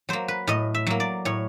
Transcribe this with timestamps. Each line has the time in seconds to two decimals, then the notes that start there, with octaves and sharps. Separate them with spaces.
0.09 F#3 A#3 C5
0.28 B4
0.47 A2 D#5
0.74 E5
0.87 F#3 A#3
1.00 D5
1.25 A2 C#5